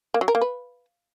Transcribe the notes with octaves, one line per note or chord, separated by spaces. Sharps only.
A#3
F#3
A#4
A#3
B4